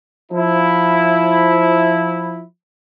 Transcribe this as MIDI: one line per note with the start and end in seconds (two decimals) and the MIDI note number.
0.32 2.42 53
0.32 2.42 64